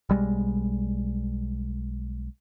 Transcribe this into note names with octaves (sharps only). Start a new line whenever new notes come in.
B1 G3 G#3